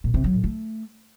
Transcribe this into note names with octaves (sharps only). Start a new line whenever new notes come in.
A#2
C3
F#3
A2
A3